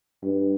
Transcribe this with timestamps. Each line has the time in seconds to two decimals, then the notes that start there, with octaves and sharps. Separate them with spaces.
0.23 G2